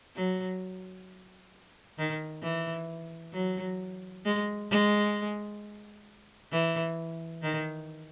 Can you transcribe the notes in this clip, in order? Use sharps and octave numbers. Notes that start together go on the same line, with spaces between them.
F#3
D#3
E3
F#3
G#3
G#3
E3
D#3